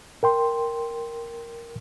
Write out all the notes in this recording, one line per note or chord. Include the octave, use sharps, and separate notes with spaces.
A#4 G5 C6